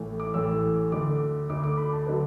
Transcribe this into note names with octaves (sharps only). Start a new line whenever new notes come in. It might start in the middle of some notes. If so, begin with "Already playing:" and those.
Already playing: A1 A2 E3 A3
D6
A1 A2 E3 A3 E6
D2 D3 A3 D6
D2 D3 A3 D6
D6
B5
A5
D3 F#3 A3 B4